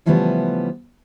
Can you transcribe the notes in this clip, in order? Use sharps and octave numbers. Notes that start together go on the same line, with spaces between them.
C#3 E3 F3 G3 A3 B3